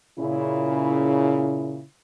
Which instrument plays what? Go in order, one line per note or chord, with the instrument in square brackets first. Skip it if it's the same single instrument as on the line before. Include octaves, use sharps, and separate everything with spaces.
[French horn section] A#2 C#3 E4